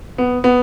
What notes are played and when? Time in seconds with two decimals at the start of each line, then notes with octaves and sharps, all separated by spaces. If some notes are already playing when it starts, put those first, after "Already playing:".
0.18 B3
0.44 B3